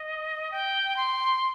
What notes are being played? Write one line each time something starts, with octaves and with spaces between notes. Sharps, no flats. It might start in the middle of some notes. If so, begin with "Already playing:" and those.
Already playing: D#5
G5
C6